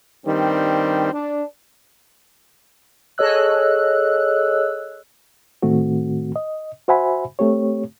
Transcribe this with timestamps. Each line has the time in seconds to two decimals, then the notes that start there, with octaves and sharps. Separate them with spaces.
0.25 G2 D#3 G3 C4
1.12 D4
3.18 G#4 A4 C#5 D#5 E6 F#6
5.62 A2 D#3 A3 C4 F#4
6.36 D#5
6.88 F#4 C5 E5 F#5 G#5 B5
7.39 A3 C4 G4 C#5